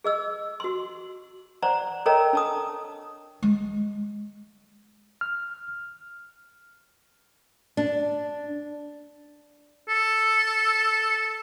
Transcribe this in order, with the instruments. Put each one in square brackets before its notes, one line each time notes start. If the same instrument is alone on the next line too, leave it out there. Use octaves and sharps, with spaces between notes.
[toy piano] G#4 D#5 E6
F#4 C6
C5 D5 F#5 A#5
A4 A#4 C#5 D#5 G5 A#5
D4 A5 D#6
[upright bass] G#3
[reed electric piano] F6
[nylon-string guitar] D4
[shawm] A4